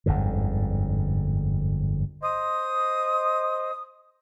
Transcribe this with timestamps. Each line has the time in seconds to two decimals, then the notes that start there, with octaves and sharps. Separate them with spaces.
0.06 G1 F2 G#2 D3
2.22 C5 D#5 D#6